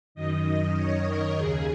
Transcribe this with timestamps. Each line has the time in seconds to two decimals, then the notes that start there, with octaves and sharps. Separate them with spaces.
0.15 F#2 D#3 D#5
0.76 C#5
1.07 A#4
1.37 D#2 C#3 G#4